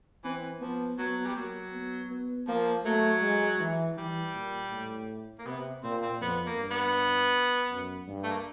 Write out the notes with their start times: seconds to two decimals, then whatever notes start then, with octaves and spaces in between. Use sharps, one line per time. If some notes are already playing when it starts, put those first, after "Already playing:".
0.24 E3 C4
0.61 F3 B3
0.98 F#3 B3
1.26 G3
1.36 F#3 A#3
1.73 B3
2.10 B3
2.48 F3 A#3
2.85 F#3 A3
3.22 G#3
3.60 E3
3.97 E3 G3
4.34 A#2
4.72 A2
5.39 A#3
5.46 C3 B3
5.83 A#2 C4
6.02 C4
6.21 F2 B3
6.46 A#3
6.58 G2
6.71 B3
7.70 F#2
8.08 G2
8.23 A3
8.31 A#3